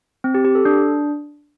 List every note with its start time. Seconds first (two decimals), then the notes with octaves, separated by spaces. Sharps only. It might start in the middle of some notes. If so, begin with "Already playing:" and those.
0.24 C4
0.35 G4
0.45 G4
0.55 A4
0.65 D4